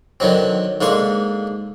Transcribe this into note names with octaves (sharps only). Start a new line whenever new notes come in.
D3 D#3 F#3 C4
G#2 D3 A#3 C6 C#6